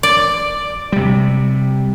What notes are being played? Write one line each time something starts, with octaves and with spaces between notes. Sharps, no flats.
D5
C3 G3